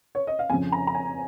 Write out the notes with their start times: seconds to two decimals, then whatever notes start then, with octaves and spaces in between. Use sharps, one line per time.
0.15 C#5
0.27 D#5
0.39 F5
0.49 F2 C#3 F3 G#5
0.72 A#5
0.87 A#5
0.95 G#5